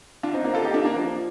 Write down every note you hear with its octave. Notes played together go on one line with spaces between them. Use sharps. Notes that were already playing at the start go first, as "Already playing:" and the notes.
D4 F4
C4 D#4
A#3 D4
F4 A4
D#4 G4
D4 F4
A#3 D4
F3